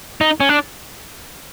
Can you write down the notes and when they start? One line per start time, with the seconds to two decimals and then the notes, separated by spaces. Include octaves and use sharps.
0.21 D#4
0.40 C#4
0.49 D4